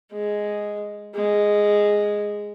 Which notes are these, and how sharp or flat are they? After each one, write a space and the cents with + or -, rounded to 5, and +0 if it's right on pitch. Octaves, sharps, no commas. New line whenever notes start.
G#3 +0
G#3 -5